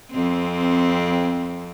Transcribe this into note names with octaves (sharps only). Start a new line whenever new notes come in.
F2 C4